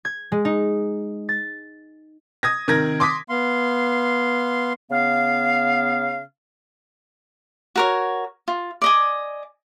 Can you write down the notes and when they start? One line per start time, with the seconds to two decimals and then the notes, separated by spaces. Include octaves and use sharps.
0.05 G#6
0.32 G#3
0.45 D#4
1.29 A6
2.43 D#6 G#6 A#6
2.68 C3 D#3 A#4 G#6 A#6
3.00 C6 D6 D#6 B6
3.29 B3 F5 C6
4.91 C#3 B3 F5
7.76 F#4 A#4 C#5
8.48 F4
8.82 D5 D#5 G#5